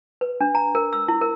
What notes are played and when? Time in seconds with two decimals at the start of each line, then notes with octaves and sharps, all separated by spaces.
0.21 B4
0.41 D4
0.55 A#5
0.75 A#4
0.93 E6
1.08 E4
1.21 A#4